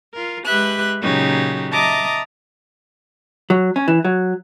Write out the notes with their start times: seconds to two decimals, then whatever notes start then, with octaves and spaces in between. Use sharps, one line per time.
0.14 F4 A#4
0.45 G#3 G4 B4 E5 F#6
1.02 A#2 C#3 F#3 D#4 G4
1.72 D#5 E5 A5 A#5 D6 D#6
3.50 F#3
3.76 C#4
3.88 E3
4.05 F#3